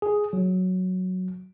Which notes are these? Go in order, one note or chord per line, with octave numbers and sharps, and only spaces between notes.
G#4
F#3